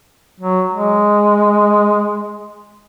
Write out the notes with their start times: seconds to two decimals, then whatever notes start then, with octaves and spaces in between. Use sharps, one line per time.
0.40 F#3
0.74 G#3